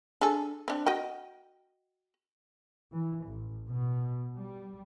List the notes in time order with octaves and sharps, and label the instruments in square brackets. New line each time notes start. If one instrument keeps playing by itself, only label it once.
[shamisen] D4 G#4 A4
C4 D4
F#4 D#5 G5
[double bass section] E3
A1
B2
G3